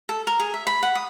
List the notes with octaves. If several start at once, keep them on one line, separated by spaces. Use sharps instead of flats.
A4
A#4
G#4
E5
B5
F#5
D#6